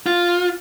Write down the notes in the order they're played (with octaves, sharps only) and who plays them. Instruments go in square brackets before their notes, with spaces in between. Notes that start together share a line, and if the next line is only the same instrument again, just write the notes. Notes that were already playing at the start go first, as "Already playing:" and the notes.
[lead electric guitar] F4